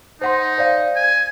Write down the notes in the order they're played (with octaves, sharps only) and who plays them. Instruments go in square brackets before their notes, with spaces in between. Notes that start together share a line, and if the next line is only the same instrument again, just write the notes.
[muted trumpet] D#4 [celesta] C5 F#5 C6
[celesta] C5 D5 F5
[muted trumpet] G#5